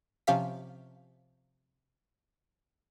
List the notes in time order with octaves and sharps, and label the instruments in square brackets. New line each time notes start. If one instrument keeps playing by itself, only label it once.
[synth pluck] C3 F3 C#4 G4 F5 B6